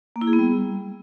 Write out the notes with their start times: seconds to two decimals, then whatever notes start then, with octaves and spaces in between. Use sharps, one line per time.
0.16 A#3
0.21 E4
0.27 G#4
0.33 B3
0.39 G3